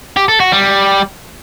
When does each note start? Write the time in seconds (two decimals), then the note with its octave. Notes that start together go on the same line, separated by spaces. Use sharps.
0.16 G4
0.28 A4
0.40 F#4
0.52 G3